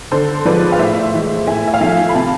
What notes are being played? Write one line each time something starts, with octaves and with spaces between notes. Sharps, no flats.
D3 A4 C5
F3 G#3 B4 D5
F5
A2 C5 E5
E3 G#3
A2 E5 G#5
E5
F5
F3 A3 E5 G#5
B5
C3 F5 A5